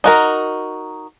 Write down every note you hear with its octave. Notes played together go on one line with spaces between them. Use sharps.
D#4 F#4 A#4